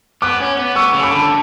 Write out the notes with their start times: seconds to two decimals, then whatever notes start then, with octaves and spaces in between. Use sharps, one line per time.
0.22 B3 D6 F#6
0.40 C#4
0.59 B3
0.75 B3 C#6 E6
0.94 C#3
1.02 B5 D6
1.11 D3